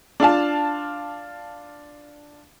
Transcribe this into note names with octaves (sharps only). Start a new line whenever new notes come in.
D4 F4 F5 A5